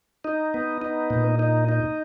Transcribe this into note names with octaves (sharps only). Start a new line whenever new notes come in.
D#4
B3
D#4
A#2
D#4
D#4